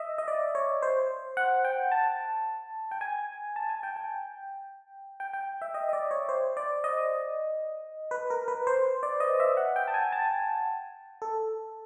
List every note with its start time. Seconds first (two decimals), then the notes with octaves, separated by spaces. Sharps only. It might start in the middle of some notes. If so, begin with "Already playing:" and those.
Already playing: D#5 E5
0.18 D#5
0.28 D5
0.55 C#5
0.82 C5
1.37 F#5
1.65 G5
1.92 A5
2.91 G5
3.01 G#5
3.56 A5
3.69 G#5
3.83 G5
3.96 G5
5.20 G5
5.33 G5
5.62 E5
5.74 D#5
5.89 D#5
5.93 D5
6.11 C#5
6.29 C5
6.57 D5
6.84 D#5
8.11 B4
8.30 A#4
8.48 B4
8.67 C5
9.03 D5
9.20 D#5
9.40 E5
9.57 F#5
9.76 G5
9.88 A5
9.94 G#5
10.12 A5
10.40 G#5
11.22 A4